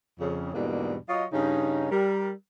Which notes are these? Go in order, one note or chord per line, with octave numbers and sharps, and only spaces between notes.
F2 C#3
E2 G#2 B2 G3 A#3 D4
F#3 F4 C#5 D#5
G2 C#3 C#4 D#4
G3 A#4